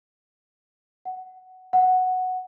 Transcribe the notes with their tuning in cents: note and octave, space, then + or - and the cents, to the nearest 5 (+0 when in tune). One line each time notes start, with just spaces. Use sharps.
F#5 +10
F#5 +0